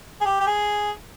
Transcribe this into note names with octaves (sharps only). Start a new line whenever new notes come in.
G#4
G4
G4
G#4